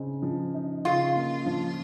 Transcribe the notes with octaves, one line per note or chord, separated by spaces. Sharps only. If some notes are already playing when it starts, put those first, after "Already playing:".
Already playing: C#3 C4 D#4
F3
D#4
C#3 F4
A#3
F3